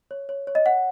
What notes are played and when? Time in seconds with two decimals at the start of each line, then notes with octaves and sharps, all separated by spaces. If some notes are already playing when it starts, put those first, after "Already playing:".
0.11 C#5
0.29 C#5
0.47 C#5
0.55 D#5
0.66 C#5 F#5